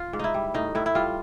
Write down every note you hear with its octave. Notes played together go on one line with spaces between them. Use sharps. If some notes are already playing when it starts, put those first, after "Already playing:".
Already playing: F4
G#2
D#4 E4
G3
A2 D#4
A2 E4
E4
G3 F4